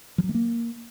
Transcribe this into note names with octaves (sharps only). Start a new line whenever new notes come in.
F3
F#3
A3
A#3